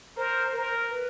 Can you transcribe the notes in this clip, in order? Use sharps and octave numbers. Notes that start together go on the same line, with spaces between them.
A#4 C5
A#4
B4